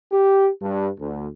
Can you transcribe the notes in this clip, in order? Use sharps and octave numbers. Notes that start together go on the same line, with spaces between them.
G4
G2
D2